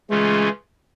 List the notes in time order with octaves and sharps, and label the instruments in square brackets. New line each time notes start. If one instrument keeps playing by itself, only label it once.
[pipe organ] C#3 E3 A3 C#4 F4 [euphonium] G#3